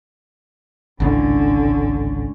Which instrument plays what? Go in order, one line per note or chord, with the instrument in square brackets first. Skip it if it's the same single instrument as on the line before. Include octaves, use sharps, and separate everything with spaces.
[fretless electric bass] G#1 C#2 A2 [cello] D3 C#4